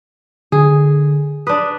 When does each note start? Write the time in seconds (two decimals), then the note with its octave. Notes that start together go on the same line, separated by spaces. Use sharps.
0.52 D3 G#4
1.47 D4 B4 D#6